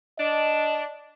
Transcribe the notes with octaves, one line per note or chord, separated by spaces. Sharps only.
D4 D#5